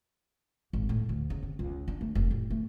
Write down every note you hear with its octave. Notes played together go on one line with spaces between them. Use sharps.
G#1
A2
D2
C#3
C3
C#2
D4
A3
F1
A1
A3